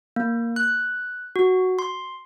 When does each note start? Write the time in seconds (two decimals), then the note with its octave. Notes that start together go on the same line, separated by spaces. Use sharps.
0.16 A#3
0.56 F#6
1.36 F#4
1.79 C6